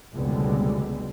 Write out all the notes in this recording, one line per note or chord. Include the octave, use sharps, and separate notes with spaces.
F1 C#2 B2 D3 G3 G#3